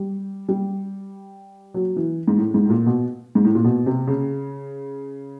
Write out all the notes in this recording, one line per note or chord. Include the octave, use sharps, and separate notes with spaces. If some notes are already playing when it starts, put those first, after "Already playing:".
Already playing: G3
G3
F#3
E3
G#2
A2
G#2
A2
A#2
B2
G#2
A2
A#2
B2
C3
C#3